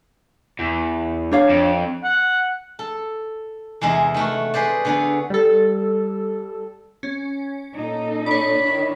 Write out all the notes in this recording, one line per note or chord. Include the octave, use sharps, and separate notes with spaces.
E2
D4 C#5 F5
F2
F#5
A4
E2 C3 G#3 E4 G#4
D#3 A3 F#4
G#4 B4 C5 D5
D3 B3 G#4
G3 A4
C#4
A#2 D#4 A4
C#5 D5 B5
D#3 D4 E4